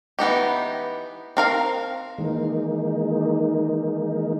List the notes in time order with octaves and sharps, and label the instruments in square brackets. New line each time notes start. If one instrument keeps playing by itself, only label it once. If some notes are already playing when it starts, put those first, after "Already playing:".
[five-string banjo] E3 B3 D#4 G4
C4 A#4 F5
[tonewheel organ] D#3 E3 G#3 A#3 D#4